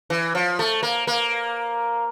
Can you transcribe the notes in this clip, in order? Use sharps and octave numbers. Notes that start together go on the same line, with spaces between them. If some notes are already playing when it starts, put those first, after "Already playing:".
E3
F3
A3
A#3
A#3